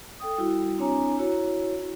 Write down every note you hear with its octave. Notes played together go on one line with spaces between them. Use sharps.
A4 G5 D#6
G3 E4 F#4
C4 D4 E4 C#5 G#5 A#5
E4 F#4 C#5